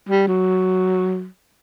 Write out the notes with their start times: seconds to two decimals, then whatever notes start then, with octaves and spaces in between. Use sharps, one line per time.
0.09 G3
0.27 F#3